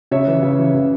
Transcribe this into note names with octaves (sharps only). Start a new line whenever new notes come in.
C#3 C#5 E5
E3
C#3
E3
C#3